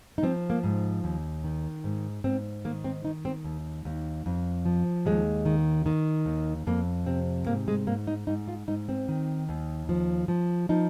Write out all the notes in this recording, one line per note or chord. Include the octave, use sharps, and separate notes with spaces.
D#4
F3 C4
A#3
G#2
D#2
D#3
G#2
G#2 C4
D#3 A#3
C4
D#3 D#4
C4
D#2
D#2
F2
F3
D#2 G#3
D#3
D#3
D#2
F2 A#3
C3 C4
G#2 A#3
G#3
G#2 A#3
D#4
G#2 D#4
F4
G#2 D#4
C4
D#3
D#2
F3
F3
F3 D#4